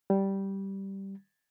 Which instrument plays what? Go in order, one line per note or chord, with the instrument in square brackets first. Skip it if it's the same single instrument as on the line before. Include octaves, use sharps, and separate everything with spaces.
[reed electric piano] G3